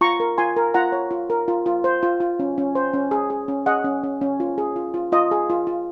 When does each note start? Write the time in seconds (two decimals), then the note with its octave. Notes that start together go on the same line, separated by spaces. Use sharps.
0.01 F4 A#5 C#6
0.20 A#4
0.38 F4 G#5 C6
0.56 A#4
0.74 F4 F#5 A#5
0.92 C#5
1.11 F4
1.30 A#4
1.48 F4
1.66 F4
1.84 C5
2.03 F4
2.20 F4
2.39 C#4
2.58 C#4
2.75 C5
2.93 C#4
3.11 G#4
3.30 G#4
3.48 C#4
3.66 G#4 D#5 F#5
3.84 C#4
4.04 C#4
4.21 C#4
4.40 F4
4.58 G#4
4.76 F4
4.94 F4
5.12 F4 D#5
5.31 G#4
5.50 F4
5.67 F4